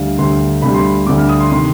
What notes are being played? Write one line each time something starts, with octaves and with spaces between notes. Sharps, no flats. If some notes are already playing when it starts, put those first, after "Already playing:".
Already playing: D2 D3 G3 F5
D2 D3 G3 C6
D2 D3 G3 B5
C6
B5
D2 D3 G3 D6
F6
D#6
C6
C3 D#3 C6